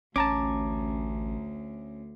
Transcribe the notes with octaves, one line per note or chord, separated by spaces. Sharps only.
A1 D2 C#4 A5 A#5 D6